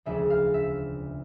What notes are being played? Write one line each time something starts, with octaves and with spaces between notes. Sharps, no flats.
E1 D2 C#3 F3 G#3 E5
F5
E5